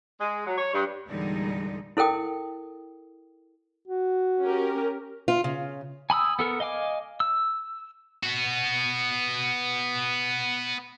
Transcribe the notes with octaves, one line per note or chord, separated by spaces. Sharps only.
G#3
F#3
C#5
G2
E2 A#2 D3 G3 G#3 D#4
E4 A4 A#4 G5 D#6
F#4
C#4 G4 A#4
F4
C#3
G#5 B5 D#6 E6
B3 A4 A#4
D#5 F5 G#5 D6
E6
B3 F#4